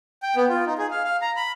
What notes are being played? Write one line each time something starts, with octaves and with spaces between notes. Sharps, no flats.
G5
B3
F4
D#4
G#4
F5
F5
A#5
B5